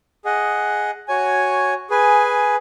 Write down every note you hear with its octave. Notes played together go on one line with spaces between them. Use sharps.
G#4 D#5 F#5
F#4 C#5 G#5
G#4 B4 G#5